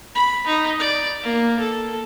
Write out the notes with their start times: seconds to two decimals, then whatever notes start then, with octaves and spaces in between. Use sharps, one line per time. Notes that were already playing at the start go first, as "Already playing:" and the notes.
0.15 B5
0.47 D#4
0.80 D5
1.23 A#3
1.59 A4